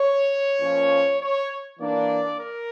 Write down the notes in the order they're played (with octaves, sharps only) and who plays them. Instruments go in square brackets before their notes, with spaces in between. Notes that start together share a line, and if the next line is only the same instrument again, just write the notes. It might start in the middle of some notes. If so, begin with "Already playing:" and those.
Already playing: [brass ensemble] C#5
A#2 F3 C#4
C#5
E3 A#3 D4 D5
A#4